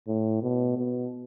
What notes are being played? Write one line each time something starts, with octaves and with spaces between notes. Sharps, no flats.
A2
B2
B2